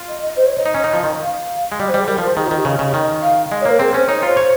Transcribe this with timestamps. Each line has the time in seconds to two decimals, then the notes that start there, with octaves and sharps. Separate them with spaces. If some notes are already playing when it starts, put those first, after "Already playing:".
Already playing: F4
0.08 D#5
0.23 D#5
0.37 C5
0.46 C#5
0.56 D#5
0.66 D#4
0.74 C#4
0.84 D#4
0.94 F3
1.04 D#3
1.22 F5
1.72 G#3
1.80 G3 D#5
1.89 C5
1.94 G3
1.99 G#4
2.08 G3 A#4
2.18 F3
2.22 C5
2.37 D#3 G#4
2.46 F4
2.51 D#3
2.56 G4
2.65 C#3 D#5
2.79 C#3
2.94 D#3
3.22 F5
3.51 G#3 D#5
3.61 C#5
3.65 A#3 A#4
3.79 C4 G#4
3.94 C#4 C5
4.08 D#4 C#5
4.18 C#5
4.23 F4 C5
4.37 C#5